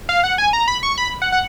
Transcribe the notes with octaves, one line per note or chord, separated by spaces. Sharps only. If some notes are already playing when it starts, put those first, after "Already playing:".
F5
F#5
G#5
A#5
B5
C#6
B5
F#5
F#5